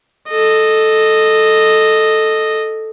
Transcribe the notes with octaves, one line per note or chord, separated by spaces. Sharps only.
A4 D#5